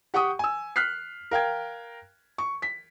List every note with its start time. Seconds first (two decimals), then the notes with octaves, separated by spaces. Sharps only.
0.14 G4 F#5 G5 C#6 D#6
0.39 G#5 E6
0.76 F6 F#6 B6 C7
1.31 A#4 F5 G5 G#6
2.38 C#6
2.62 B6